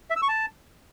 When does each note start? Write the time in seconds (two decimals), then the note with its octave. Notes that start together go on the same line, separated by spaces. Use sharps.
0.10 E5
0.16 E6
0.22 C#6
0.28 A5